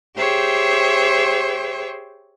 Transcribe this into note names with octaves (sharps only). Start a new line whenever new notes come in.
G4 G#4 C5 C#5 E5 G5